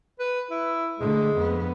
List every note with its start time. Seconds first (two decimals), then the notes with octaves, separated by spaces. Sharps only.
0.19 B4
0.51 E4
0.99 D3 G#3 A3
1.37 F2 B3